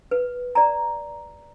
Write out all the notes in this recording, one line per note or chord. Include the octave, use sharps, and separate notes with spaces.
B4
D5 A#5